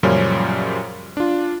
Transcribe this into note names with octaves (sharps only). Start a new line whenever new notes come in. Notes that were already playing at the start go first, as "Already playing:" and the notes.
F#2 A#2 C#3 F3 G3 C#4
D4 F4